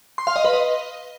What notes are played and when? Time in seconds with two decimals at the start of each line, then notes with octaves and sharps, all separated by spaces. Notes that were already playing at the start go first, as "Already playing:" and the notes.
0.18 C6
0.27 F5
0.36 D#5
0.45 B4
0.53 D#5